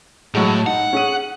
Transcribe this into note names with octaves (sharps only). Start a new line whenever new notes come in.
A2 F#3 G#3
D#4 F#5
C#4 G#4 D#7